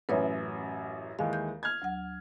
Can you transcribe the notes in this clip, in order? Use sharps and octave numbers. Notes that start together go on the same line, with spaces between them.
A1 F#2 B4 C#5 E5
D#2 E3 G#3 F5
G6
F6 G#6
D2 F#3 F#5